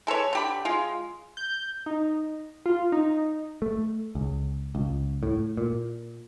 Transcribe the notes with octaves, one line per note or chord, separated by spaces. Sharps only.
G#3 A4 B4 C#5
D3 G4 B5
G#3 F4
G6
D#4
F4
D#4
A3
C#2
C#2
A2
A#2